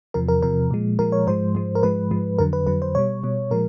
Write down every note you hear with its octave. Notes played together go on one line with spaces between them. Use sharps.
E2 C3 F3 A#4
A#4
E2 C3 F3 A#4
A#2 F3 G#3
A#2 F3 G#3 A#4
C#5
G#2 F3 G#3 C5
G#2 F3 G#3
A#4
G#2 F3 G#3 B4
G#2 F3 G#3
F2 D3 F#3 A#4
B4
F2 D3 F#3 B4
C5
B2 G3 C#5
B2 G3
A#2 F3 G#3 A#4